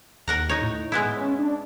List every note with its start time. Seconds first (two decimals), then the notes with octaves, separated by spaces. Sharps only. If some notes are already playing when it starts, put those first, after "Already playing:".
0.28 D#2 A#4 F#5 A#5
0.49 D#4 C#5
0.62 A2
0.92 G#3 B3 E4
1.16 C#4
1.39 D4